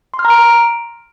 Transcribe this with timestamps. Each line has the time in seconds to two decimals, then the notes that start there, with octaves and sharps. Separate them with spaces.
0.14 C6
0.19 F6
0.25 A#5
0.30 D7